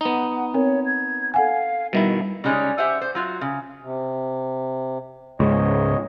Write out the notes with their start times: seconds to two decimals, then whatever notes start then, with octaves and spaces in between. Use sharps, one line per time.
0.01 B3 D#4 F#5
0.54 C4 A#4 C#5
0.86 G#6
1.34 A4 F5 F#5 G#5
1.93 B2 D#3 G3 E4 E5
2.44 C#3 G3 G#3 C#4 D#4
2.78 G4 C5 E5 F#5 G#5
3.01 C5
3.15 F#3 F4 F#4
3.41 C#3
3.82 C3
5.40 C#2 G#2 C#5 D#5